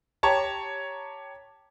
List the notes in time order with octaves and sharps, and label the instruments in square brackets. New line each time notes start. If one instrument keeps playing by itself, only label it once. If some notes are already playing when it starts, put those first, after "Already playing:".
[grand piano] G4 C#5 A5 A#5